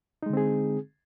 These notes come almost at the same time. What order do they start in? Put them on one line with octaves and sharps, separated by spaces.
D#4 G#3 D3 C4 G#4